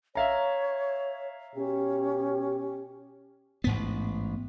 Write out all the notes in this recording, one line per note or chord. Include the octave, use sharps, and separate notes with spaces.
C#5 E5 F5 A#5
B2 C#4 G4
A1 G#2 B3